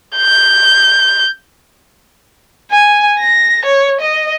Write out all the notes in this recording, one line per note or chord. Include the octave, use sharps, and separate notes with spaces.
G6
G#5
A#6
C#5
D#5